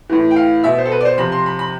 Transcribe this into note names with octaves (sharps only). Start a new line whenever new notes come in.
A2 E3
G5
F5
B2 E5
C5
A4
B4
D5
C5
C3 F3 B5
C6
B5
B5